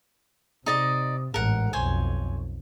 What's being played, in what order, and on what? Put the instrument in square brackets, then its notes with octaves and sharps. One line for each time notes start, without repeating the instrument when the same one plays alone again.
[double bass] C3 [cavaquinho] D#4 D5 D#5
[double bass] A1 G#2 [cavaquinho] A#4 F#5
[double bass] B1 F2 [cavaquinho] C5 C#5 G#5